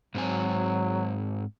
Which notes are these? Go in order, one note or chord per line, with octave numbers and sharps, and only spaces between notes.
G#2 F#3 C4 G#5